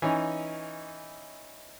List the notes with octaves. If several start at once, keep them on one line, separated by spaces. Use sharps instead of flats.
E3 C#4 D#4